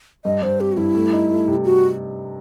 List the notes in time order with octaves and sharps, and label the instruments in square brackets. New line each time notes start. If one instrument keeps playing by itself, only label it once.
[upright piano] G2 [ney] D#5
[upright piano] G2 [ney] C5
[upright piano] C4 [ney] G4
[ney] F#4
[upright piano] G2 [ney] E4
[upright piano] A3
D#4
A3
C3
[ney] F#4